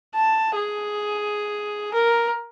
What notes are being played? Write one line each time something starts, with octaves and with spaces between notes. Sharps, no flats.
A5
G#4
A#4